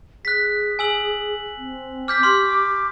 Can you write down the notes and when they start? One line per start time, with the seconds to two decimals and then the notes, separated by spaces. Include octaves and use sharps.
0.25 G#4 F#6 B6
0.79 G#5 E6 F#7
1.58 C4
2.08 D6 F6 G6 B6
2.23 G4 C6 C#6 F6